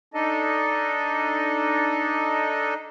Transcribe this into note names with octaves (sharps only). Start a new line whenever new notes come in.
D4 D#4 A4 D#5